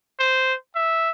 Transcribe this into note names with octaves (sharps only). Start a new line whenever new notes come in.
C5
E5